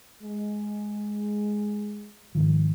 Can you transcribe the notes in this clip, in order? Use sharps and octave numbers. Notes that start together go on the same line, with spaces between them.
G#3
G#2 D#3 F3